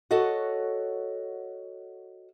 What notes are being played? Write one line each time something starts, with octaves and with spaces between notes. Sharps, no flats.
F#4 A4 C#5 D#5 F#5